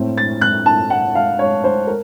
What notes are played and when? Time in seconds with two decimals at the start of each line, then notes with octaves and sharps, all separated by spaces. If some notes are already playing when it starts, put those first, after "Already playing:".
Already playing: A2 A3 C4
0.18 A6
0.41 F#6
0.66 A5
0.90 F#5
1.15 F5
1.39 C#5
1.64 C5
1.87 A#4